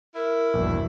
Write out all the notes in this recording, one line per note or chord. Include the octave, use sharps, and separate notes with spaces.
E4 A#4
A#1 E2 G2 B2